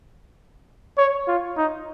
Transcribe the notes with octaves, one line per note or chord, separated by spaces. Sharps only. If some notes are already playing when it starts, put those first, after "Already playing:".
C#5
F4
D#4